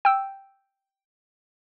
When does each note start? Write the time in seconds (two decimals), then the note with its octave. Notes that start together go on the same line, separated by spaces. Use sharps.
0.05 G5 E6